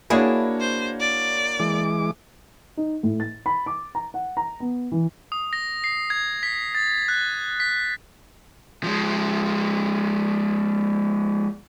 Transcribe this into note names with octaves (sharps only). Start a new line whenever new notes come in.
A#3 D4 E4 F#4 G#4 C#5
C5
D5
E3 G#3 D6
D#4
A2
A6
B5
D6
A#5
F#5
A#5
B3
E3
D#6
A#6
C7
G#6
B6
A6
F#6
B6
F3 G#3